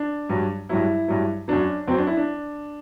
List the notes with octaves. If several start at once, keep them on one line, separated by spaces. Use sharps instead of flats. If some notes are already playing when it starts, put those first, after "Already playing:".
Already playing: D4
G2 F#3
G2 F#3 E4
G2 F#3
F#2 F#3 D4
F#2 F#3 C4
D4
E4
D4